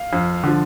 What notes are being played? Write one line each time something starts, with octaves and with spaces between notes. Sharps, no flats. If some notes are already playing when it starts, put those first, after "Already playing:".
Already playing: F5
F2
D3 F3